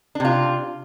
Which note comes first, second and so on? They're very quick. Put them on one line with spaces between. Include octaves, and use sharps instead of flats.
D4 C3 F4